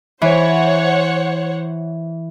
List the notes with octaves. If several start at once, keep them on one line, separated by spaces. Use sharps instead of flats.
E3 C5 C#5 F#5